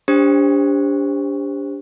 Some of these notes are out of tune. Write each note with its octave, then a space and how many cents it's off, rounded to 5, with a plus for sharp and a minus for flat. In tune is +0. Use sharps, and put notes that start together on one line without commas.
D4 -30 G4 +25 C5 +5